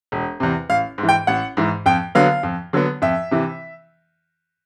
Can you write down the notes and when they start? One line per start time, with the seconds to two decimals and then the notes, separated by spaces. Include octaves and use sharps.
0.12 E1
0.40 E2 C3
0.69 A1 F5
0.98 G#2
1.03 E3
1.09 G5
1.27 A1 F#5
1.57 G#2 E3
1.86 F2 G5
2.15 D3 F#3 B3 F5
2.43 F2
2.73 D3 F#3 B3
3.02 F2 E5
3.31 C3 E3